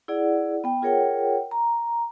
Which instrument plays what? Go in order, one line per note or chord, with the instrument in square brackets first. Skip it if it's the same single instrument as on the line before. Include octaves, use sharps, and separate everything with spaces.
[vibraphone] E4 G#4 D5 F#5
B3 G5
F4 G#4 A#4 C#5 F#5 G5
A#5